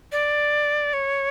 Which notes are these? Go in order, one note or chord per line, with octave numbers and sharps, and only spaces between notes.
D5
C#5